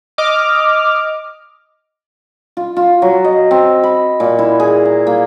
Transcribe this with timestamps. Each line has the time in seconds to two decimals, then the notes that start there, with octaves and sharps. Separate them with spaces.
0.18 D#5 D6 F6
2.57 F4
2.77 F4
3.02 F#3
3.25 D#5
3.51 C4
3.84 B5
4.20 A#2
4.39 E4
4.60 G#4
4.85 A#5
5.07 A#3